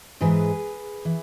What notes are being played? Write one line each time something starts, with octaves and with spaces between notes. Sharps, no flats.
G#2 E3 G#4 B4
E3